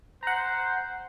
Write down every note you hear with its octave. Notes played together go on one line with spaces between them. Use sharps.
C5 F#5 A#5